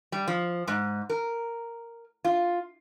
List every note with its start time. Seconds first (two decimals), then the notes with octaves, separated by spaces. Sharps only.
0.12 G3
0.28 F3
0.68 G#2
1.10 A#4
2.24 F4